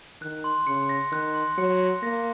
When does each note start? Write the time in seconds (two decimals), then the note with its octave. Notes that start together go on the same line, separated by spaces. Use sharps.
0.21 D#3 F#6
0.44 C6
0.67 C#3 C#7
0.89 A#6
1.12 D#3 F#6
1.35 C6
1.58 F#3 C#7
1.80 A#6
2.02 A#3 A#6